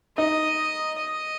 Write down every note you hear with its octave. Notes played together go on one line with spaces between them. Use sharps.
D#4 D#5
D#5